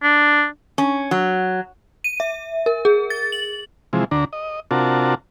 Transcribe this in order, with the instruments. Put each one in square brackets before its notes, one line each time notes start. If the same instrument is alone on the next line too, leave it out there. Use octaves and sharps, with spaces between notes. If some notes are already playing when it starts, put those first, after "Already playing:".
[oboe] D4
[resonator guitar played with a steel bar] C#4
F#3
[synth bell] D#7
E5
A#4
G#4
A6
F#7
[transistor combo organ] C3 E3 F3 G#3
D2 D3 D4 A#5
D#5
C3 D4 F4 F#4 A#4 A5